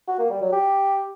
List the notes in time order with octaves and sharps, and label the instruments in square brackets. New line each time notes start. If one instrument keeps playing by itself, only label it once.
[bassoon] F#4
A#3
G3
F#3
G4